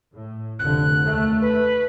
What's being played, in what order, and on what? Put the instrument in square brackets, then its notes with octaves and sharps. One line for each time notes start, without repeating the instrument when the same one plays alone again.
[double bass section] A2
[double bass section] F1 D3 [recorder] F#6
[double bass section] D#2 A3
[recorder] B4